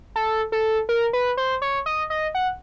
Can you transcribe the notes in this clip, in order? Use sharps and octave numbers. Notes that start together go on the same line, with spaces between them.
A4
A4
A#4
B4
C5
C#5
D#5
D#5
F#5